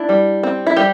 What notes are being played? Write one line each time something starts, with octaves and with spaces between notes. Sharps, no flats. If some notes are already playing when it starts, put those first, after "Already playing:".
Already playing: D4 E4
G3
C4
E4
G3 G4